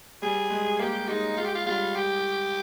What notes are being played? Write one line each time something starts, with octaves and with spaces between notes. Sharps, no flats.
G3 G#4
G#3
A#3 G4
G#3 D#4
G#3 F4
G4
F4
G3 F4
G4